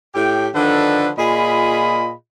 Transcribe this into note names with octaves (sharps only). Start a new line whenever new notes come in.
A2 G4 G5
D3 D#3 F3 D4 A4 B4
A#2 F4 G#4 D#5 B5